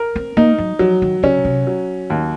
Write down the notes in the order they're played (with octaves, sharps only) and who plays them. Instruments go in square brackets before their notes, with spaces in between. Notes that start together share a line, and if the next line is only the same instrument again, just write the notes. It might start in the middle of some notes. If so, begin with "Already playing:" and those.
Already playing: [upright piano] A#4
[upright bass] C4
[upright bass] A#3 [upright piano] D#4
[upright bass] F#3
[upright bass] F3 [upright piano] F#3
[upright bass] D#3
[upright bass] C#3 [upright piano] C#4
[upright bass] C3
[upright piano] F#3
D#2